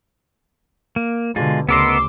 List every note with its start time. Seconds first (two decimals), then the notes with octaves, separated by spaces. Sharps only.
0.96 A#3
1.36 B2 D3 G#3 F4
1.69 D2 C#3 B3 A#4 D#5 C6 D6 E6